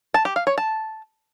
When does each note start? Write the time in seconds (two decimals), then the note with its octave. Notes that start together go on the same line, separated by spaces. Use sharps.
0.14 A5
0.25 G4
0.36 F5
0.47 C#5
0.58 A5